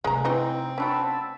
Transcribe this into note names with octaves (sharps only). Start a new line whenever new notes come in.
C3 G#3 A3 G#5 A#5
E3 C4 D#4
C#4 D4 F#4 A5 B5 E6